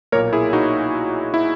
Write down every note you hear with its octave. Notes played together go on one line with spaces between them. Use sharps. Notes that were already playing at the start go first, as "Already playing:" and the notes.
B1 A#2 A#3 A#4 C#5
E4 G#4
D#4 F#4
E4